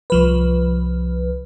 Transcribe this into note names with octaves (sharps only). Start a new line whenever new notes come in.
C2 F3 B4